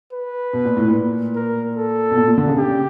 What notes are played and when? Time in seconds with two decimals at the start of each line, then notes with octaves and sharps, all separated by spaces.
0.13 B4
0.53 B2
0.65 A#2
0.77 A2
0.88 A#2
1.35 A#4
1.76 A4
2.11 B2
2.17 A#2
2.28 A#2
2.38 D3
2.48 C#3
2.58 C#3 G4